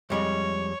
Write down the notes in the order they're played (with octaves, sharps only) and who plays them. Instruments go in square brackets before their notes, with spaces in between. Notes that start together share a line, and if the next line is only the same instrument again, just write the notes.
[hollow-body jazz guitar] F2 G3 G#3 [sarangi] C#5